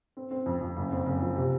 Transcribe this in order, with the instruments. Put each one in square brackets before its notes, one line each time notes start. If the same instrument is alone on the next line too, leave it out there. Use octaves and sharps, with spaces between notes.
[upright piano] C4
C4
F2
F2
F#1
C4
F#1
F3
C3